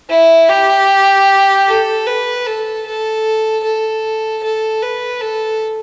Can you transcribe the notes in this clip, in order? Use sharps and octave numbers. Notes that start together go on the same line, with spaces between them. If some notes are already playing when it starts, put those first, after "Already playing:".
E4
G4
A4
B4
A4
A4
A4
A4
B4
A4